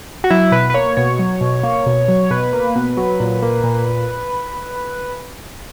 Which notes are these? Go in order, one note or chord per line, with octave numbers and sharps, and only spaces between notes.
F#4
F#3 E4
B2 B4
B4
A#3 C#5
B2 C#5
F#3
B2
A#3
B2
F#3
B2 B4
A#3
B2
F#3
A#2
A#3
A#2